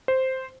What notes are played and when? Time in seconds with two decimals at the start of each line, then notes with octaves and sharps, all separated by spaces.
0.08 C5